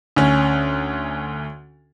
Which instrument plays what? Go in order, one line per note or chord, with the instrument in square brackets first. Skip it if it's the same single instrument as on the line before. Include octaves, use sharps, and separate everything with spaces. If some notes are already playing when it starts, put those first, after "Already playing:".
[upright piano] D2 C#4